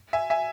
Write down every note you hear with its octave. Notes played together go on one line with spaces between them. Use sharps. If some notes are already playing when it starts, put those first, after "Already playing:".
E5 G#5
E5 G#5